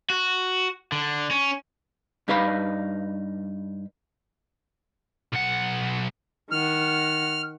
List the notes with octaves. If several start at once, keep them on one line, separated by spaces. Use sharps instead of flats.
F#4
D3
C#4
G2 D#4 B4 F5 B5
B1 F#5
D#3 F#5 F6